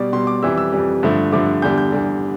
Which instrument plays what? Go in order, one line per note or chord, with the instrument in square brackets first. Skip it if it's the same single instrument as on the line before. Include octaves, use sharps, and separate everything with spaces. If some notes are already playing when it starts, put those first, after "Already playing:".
Already playing: [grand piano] B2 G3 D5
B2 G3 C6
D6
F2 E3 G3 E6
E6
F2 E3 G3
G2 D3 F3 A3
G2 D3 F3 A3 D6
E2 D3 G3 G6
G6
E2 D3 G3